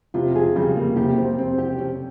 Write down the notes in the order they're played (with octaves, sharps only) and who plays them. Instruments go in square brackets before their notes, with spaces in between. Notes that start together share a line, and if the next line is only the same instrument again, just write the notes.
[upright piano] C3 [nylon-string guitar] F4
[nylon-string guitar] G#4
[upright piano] C#3 [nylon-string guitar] G3
[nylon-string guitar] A#3
[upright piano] C3 [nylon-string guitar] G4
[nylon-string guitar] C5
C4
G4
C#4